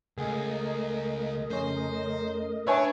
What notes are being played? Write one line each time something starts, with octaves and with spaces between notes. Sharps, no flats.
C#2 A3 G#4 A#4 D#5
F2 C#3 C#4 C5
D4 B4 C#5 D#5 E5 G#5 G#6